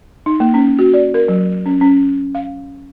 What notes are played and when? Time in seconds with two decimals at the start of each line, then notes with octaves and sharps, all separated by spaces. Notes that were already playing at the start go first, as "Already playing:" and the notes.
0.26 D#4
0.40 A#3
0.54 C#4
0.79 F#4
0.94 D5
1.14 A#4
1.28 F#3
1.66 C#4
1.81 C#4
2.35 F5